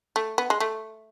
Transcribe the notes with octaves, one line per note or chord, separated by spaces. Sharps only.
A3
B3
G#3
A3